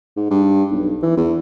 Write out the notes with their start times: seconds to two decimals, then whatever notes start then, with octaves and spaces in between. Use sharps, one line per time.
0.17 G#2
0.30 G2
0.72 B1
1.02 E3
1.17 E2